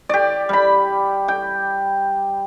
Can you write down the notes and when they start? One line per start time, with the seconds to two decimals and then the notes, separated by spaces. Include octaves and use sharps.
0.09 G4 D5
0.49 G3 B5
1.28 G5